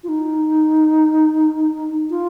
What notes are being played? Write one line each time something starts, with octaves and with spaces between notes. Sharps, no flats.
F4
D#4
F4